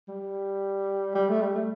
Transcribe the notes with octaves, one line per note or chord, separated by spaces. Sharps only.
G3
G3
A3
G3
A3